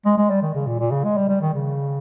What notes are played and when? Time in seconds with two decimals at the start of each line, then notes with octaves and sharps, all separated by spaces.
0.06 G#3
0.18 G#3
0.30 G3
0.42 D#3
0.54 C#3
0.67 A#2
0.79 A#2
0.91 C#3
1.04 G#3
1.17 G3
1.29 G3
1.41 D#3
1.54 C#3